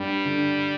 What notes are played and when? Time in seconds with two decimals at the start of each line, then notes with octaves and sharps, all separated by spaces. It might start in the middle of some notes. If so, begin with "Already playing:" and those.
Already playing: G2 G3
0.25 D3